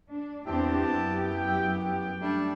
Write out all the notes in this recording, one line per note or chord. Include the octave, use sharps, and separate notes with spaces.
D4
E2 B3 C4 D4 E4 G4 A5
F#2
G5
G5
G3 A3 D4